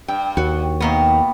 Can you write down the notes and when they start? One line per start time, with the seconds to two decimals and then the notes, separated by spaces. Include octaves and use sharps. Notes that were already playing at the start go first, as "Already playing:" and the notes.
0.08 G2 G5
0.37 D#2 F#4
0.80 B2 D#3 A#3 B3